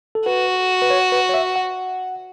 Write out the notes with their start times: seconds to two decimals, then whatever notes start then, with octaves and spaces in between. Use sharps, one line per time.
0.15 A4
0.26 F#4 B4
0.82 B4
0.90 C#5
1.12 B4
1.29 C#5
1.34 E5
1.56 F#5